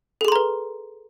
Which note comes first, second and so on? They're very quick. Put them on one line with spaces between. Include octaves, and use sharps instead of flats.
A4 G#4 C6 A#5 B4